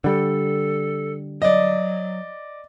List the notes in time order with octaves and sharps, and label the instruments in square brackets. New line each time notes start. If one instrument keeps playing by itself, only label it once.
[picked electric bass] D3 G3 [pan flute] A4
[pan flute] F#3 [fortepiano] D5 D#5